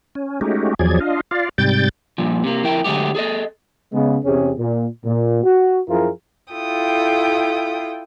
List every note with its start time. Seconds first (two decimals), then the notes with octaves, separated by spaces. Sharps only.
0.15 C#4
0.41 G#3 A3 C#4 D#4 F#4 G4
0.79 E2 F3 F#3 G#4 D5 G#6
1.00 D4 F4 D#5 F5
1.31 F4 D5 F5
1.58 G#2 C3 G3 G5 G6 A6
2.18 G2 A#2 F3
2.44 C3 A#3
2.63 F2 E4 A#4 G5
2.84 D3 F#3 G#3 A3 G4
3.15 G#4 A4 C5 D#5
3.93 C#3 G#3 B3
4.25 E2 C3 C#4 G4 G#4
4.59 A#2
5.05 A#2
5.44 F#4
5.89 F#2 F3 E4 F4 G#4 A#4
6.51 E4 F4 A4 G5 D#6